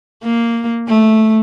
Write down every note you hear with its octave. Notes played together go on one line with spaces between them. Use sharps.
A#3
A3